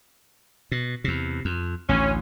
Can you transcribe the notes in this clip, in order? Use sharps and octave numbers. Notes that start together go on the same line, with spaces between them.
B2
E2 C3
F2
A1 D2 C#4